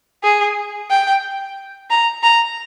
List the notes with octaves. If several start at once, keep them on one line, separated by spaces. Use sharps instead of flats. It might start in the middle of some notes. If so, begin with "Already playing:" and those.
G#4
G5
A#5
A#5